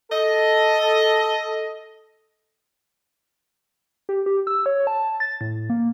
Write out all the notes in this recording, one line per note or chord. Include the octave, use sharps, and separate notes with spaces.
A4 D#5
G4
G4
E6
C#5
A5
A6
A2
A#3